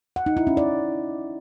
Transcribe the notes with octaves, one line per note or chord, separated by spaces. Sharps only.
F#5
D#4
E4
C#4
D5